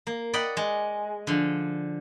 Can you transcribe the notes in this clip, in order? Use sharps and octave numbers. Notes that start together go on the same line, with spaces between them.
A#3
D5 D#5 F#5 G5 B5
G#3
D3 F3